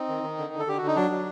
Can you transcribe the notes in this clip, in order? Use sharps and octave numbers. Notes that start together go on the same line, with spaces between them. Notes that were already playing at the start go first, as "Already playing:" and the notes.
Already playing: C4 D#4
D#3
D#3
D3
D3
A4
D3 G4
F#4
D3
D#4
F#3 D4
F#3